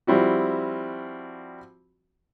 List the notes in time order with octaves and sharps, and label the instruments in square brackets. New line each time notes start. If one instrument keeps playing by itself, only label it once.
[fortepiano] F3 G3 C4 E4 F#4